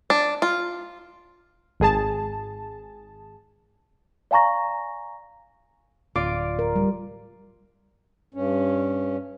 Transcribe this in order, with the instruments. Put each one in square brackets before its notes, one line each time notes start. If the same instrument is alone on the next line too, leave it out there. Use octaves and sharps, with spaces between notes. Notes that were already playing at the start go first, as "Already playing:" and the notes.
[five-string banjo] D4
F4
[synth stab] G#1 G#4 A5
[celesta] D5 F5 G#5 A#5 C#6 A#6
[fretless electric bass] D1 [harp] F4 D5 D6
[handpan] A#4
G3
[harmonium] G2 C#4